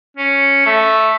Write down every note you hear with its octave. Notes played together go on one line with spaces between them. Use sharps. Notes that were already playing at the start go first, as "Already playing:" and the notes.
C#4
A3